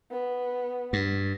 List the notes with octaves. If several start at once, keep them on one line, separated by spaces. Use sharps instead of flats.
B3
G2